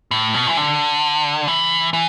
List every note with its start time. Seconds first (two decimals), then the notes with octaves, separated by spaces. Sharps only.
0.11 A2
0.34 B2
0.47 E3
0.57 D3
1.48 E3
1.93 E3